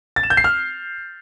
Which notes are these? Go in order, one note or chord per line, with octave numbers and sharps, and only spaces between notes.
A6
E7
G6
C7
F6